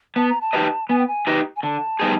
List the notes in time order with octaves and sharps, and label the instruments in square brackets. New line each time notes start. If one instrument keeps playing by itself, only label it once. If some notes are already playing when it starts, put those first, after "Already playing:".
[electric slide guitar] B3 [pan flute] A5
[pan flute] A#5
A5
[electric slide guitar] D#4 G4 B4 D#5
[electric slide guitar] B3 [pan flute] G#5
[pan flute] G5
G#5
[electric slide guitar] D#4 G4 B4 D#5
[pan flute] G#5
[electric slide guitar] D3 [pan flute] A5
[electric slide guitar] G3 B3 D#4 G#4